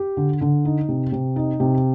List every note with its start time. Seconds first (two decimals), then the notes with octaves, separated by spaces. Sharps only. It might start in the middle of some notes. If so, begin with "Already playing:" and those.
Already playing: G4
0.17 D3
0.41 D3
0.65 D#4
0.89 C3
1.12 C3
1.36 D#4
1.60 C3